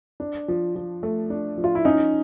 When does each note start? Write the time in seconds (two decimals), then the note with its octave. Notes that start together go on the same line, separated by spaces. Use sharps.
0.20 D4
0.48 F3
0.76 F3
1.03 A3
1.30 D4
1.58 F3
1.64 F4
1.75 E4
1.85 C#4 D#4